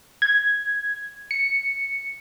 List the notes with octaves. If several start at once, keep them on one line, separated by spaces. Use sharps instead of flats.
G#6
C#7